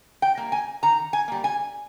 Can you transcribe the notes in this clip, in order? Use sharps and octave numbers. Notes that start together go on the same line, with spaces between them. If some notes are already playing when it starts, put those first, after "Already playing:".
G5
G3 A#3
G#5
D#3 A#5
G#5
G3 A#3
G#5